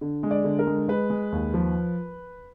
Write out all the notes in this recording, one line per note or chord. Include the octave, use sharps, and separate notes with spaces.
D3
G#3
D5
D3
A#4
G#3
G#3 B4
G#3
D#2
F3